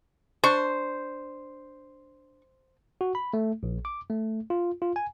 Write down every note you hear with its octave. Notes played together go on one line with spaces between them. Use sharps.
D4 C5 C#6
F#4
B5
A3
A#1
D6
A3
F4
F4
G#5